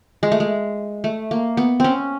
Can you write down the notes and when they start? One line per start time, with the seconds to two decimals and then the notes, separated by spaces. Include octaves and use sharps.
0.23 G#3
0.32 A3
0.40 G#3
1.04 A3
1.31 A#3
1.57 B3
1.80 C4 C#4